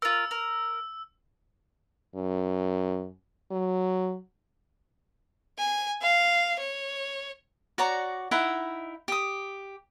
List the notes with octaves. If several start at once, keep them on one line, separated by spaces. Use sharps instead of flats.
F4 A#4 E6
A#4
F#2
F#3
G#5
F5
C#5
F#4 C#5 D5 A#5
D#4 E4 E5 F#5
G4 D#6